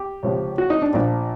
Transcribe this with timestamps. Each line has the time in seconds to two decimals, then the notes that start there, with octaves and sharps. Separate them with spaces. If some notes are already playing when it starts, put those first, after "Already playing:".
Already playing: G4
0.23 C#2 C3 F3
0.58 F#4
0.70 D#4
0.82 D4
0.93 A#1 A#2 F3 D4